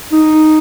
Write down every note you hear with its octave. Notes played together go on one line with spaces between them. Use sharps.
D#4